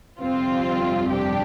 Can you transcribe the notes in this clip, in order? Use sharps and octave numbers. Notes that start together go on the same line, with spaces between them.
G1 F2 C3 G3 C4 F4
D4 G4